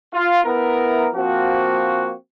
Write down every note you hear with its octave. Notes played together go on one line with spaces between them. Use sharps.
F4
B3 E4 A#4
F3 A#3 C4 F#4